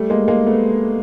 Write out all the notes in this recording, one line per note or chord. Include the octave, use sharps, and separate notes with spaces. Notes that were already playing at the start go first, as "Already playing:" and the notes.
Already playing: G3 A3
G#3 A#3
G#3 A#3
A3 B3